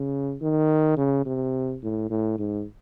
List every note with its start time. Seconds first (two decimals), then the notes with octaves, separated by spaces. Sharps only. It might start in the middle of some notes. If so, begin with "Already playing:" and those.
Already playing: C#3
0.42 D#3
0.97 C#3
1.26 C3
1.83 A2
2.10 A2
2.38 G#2